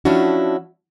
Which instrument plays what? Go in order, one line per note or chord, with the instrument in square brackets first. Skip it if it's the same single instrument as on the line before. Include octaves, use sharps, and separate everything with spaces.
[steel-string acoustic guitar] F3 C#4 D4 E4 F#4